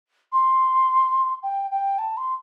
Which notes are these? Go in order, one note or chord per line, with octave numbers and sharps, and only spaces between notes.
C6
G5
G5
A5
C6